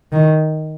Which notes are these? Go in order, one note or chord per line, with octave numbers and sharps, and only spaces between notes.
D#3